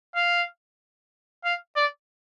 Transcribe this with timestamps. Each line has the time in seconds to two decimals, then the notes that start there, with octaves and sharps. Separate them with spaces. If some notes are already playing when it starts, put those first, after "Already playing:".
0.15 F5
1.44 F5
1.76 D5